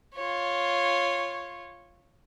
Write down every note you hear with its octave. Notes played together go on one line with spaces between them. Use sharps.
F4 C#5